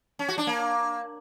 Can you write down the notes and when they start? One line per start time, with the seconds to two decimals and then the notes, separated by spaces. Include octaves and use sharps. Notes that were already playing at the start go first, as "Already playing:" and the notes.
0.19 C#4
0.28 F#4
0.38 D4
0.47 A#3